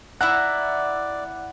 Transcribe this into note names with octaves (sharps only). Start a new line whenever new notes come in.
E4 D5 E5 F#5 A#5 F#6